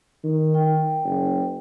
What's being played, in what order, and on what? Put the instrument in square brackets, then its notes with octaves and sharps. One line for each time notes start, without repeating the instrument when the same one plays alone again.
[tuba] D#3
[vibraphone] G5
[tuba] F#1